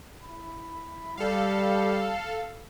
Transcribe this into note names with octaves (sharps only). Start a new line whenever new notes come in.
E4 B5
G3 A4 F5